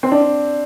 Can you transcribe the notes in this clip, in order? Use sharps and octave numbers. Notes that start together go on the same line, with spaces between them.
C4
D4